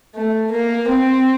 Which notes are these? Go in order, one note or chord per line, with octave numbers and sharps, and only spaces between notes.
A3
A#3
C4